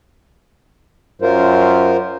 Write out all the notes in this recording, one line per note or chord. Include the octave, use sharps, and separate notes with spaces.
F#2 F4 A#4 C5